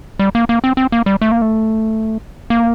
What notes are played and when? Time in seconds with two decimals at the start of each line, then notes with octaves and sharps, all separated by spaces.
0.19 G3
0.35 A#3
0.49 A#3
0.64 C4
0.77 C4
0.92 A#3
1.06 G3
1.22 A3
1.32 A#3
1.42 A3
2.50 A#3